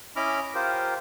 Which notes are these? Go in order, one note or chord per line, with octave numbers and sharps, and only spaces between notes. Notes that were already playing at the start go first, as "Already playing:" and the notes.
C#4 E4 D#5 B5 D6 F6
F4 G4 A#4 C5